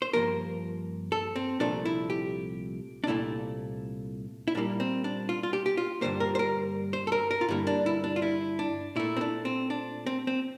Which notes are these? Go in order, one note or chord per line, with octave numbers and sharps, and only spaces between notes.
C5
G2 F3 A#3 A#4
A4
C4
C2 A#2 F3 A3 D4
E4
G4
D4
C2 A#2 A3 E4
E4
A#2 G3 A#3 D4
C4
D4
F4
F4
G4
G4
F4
G2 D3 G3 A#3 C5
A#4
C5
A#4
C5
A4
A#4
A#4
F4
G2 D3 G3 A#3 E4
D4
E4
D4
F4
E4
D4
A#2 A3 E4
C4
D4
C4
D4
C4
C4